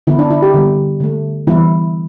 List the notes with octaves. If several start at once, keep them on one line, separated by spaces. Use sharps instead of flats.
D3 B3 E4
D4
E4
G4
D3 G3 B3
D3 A3
E3 G3 B3 E4